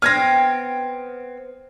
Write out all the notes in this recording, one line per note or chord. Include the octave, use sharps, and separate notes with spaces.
B3 C4 F6 G#6 A#6